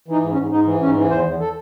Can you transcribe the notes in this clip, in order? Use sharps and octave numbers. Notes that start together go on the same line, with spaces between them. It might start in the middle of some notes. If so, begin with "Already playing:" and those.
E3 D#4
G#2
C#4
G#2
G#2 D#4
E3
G#2 C#4
E3
E2 C5
E2
A4